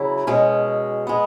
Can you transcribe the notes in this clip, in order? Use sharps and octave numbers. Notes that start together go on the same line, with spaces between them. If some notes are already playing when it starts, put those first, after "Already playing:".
Already playing: C#3 F#3 E4
B2 G#3 C#4
G#3 B3